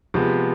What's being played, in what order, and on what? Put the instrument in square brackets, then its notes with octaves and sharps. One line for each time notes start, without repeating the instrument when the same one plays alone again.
[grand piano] C3 F3 G#3 B3